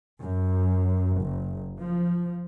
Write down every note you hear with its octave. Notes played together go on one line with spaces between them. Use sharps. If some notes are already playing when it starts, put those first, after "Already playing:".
F#2
F#1
F3